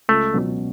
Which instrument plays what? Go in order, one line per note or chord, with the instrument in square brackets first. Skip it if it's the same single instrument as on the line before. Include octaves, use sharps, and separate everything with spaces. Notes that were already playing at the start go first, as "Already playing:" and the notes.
[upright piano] C#2 [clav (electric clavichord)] A3
[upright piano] B2 F#3 C#4